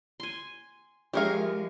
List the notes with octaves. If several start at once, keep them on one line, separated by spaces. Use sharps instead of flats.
G#5 C6
F3 G#3 E4 G4 G#4 A#4 F5 C#6